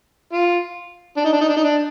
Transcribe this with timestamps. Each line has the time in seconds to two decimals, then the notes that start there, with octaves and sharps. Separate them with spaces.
0.33 F4
1.17 D4
1.25 D#4
1.33 D4
1.41 D#4
1.49 D4
1.57 D#4
1.64 D4